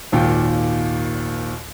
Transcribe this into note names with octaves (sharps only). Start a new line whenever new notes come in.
G#1 D#2 A#2 G5